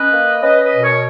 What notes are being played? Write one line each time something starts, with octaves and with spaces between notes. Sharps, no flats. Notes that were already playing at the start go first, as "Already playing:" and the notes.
Already playing: C#4 B4 D#5
A#3
C#4 B4 D#5
B4 D#5
B2
A#4 C#5